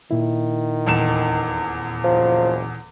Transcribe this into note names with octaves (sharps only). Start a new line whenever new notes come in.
A#2 D#3 E4
D#1 E2 E7
F#1 F3